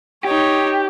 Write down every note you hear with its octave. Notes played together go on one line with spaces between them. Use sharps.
D#4 G4 C#5